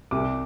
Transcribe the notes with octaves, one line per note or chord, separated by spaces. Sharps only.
C2 D6